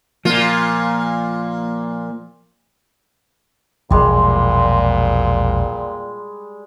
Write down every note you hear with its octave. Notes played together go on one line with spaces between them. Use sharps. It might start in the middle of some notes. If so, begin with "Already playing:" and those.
A#2 F3 A#3 F4
E1 A#1 A#2 G3 G#3